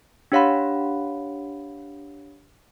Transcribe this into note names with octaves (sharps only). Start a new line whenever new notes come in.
D4 G4 C#5 F5 F#5 B5